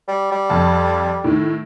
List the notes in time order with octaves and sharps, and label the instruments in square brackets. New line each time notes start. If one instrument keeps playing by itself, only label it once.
[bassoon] G3
G3
[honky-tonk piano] F2 A5
A2 D#3